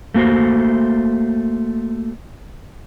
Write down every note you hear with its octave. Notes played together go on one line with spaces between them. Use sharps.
A3 A#3 F#4 C5